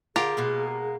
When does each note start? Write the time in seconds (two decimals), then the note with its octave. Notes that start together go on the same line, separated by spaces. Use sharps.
0.16 D3 F4 G4 G#4 A#4
0.37 B2 G#3 A#3